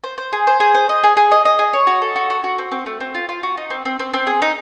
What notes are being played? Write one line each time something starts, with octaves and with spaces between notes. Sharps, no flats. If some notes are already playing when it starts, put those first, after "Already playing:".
C5
C5
G#4
C5
G#4
C5
D#5
G#4
G#4
D#5
D#5
G#4
C#5
F#4
A4
F#4
F#4
F#4
C4
C4
A3
C4
F4
F4
F#4
D#4
C4
C4
C4
C4
G#4
D#4